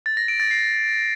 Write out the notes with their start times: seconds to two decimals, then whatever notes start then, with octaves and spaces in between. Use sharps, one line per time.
0.06 A6
0.17 A#6
0.28 D7
0.40 A6
0.51 C7